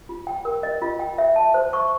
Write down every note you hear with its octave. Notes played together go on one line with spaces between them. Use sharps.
F4
G5
A#4
D#5
F4
G5
E5
A5
C5
C#6